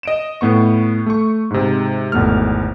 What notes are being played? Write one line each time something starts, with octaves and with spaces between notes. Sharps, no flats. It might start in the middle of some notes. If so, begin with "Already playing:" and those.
D#5 D7 E7
A2 B3 C#6
A3 C#6
G#2 C3
G#1 E2 B2 A3 F6